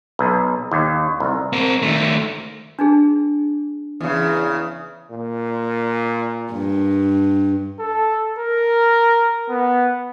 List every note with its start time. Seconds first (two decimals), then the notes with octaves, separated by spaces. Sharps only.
0.19 B1
0.71 D#2
1.20 C2
1.53 C4 A#4
1.82 D#3 A3
2.79 D4 D#4 G#4
4.00 E2 C#3
5.11 A#2
6.53 G2
7.79 A4
8.39 A#4
9.49 B3